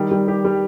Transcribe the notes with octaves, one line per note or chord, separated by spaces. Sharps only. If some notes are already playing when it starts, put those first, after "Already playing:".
Already playing: D#3 G3
G3
G4
G3